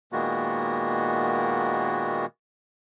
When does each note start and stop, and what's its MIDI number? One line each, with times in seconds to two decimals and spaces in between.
0.12 2.26 46
0.12 2.26 51
0.12 2.26 56
0.12 2.26 58
0.12 2.26 59
0.12 2.26 66